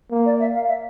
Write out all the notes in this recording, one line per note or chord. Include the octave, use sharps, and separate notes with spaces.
A#3
D5
E5
F5
E5